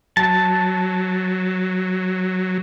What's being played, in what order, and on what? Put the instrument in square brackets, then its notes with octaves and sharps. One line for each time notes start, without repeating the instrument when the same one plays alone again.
[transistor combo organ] F#3 [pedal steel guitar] A5